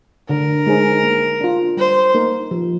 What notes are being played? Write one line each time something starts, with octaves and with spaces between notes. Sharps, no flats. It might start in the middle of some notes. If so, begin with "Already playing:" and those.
D3 A#4
G#3 D#4 G#4 C5
A#3
D4 F4
G3 C5
A#3 D#4 A#4
F3